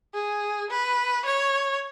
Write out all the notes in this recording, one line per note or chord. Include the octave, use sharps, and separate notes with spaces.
G#4
B4
C#5